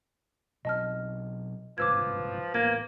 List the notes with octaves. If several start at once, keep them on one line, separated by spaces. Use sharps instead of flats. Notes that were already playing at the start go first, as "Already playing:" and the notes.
B2 F#3 C4 D#5 A5 F6
G1 C2 G#2 F3 B4 D6 E6 G#6
A1 A#3 B3 G#6